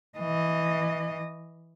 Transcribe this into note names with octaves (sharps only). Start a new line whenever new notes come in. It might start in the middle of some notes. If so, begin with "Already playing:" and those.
E3 D#5